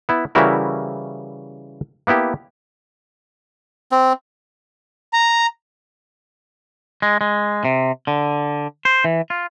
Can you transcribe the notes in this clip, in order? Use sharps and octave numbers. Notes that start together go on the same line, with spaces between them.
B3 E4
C#3 E3 G3 E4 F#4 A#4
A#3 B3 E4 G4
C4
A#5
G#3
G#3
C3
D3
C5
E3
F4